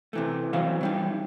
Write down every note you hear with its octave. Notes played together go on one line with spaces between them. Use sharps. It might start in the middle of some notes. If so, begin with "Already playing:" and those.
C3 E3 A3
E3 F#3 G3 C4 F5
E3 G3 D#4